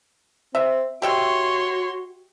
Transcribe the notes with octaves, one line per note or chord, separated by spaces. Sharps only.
C4 E5
F#4 G4 C#5 E5 G5 C6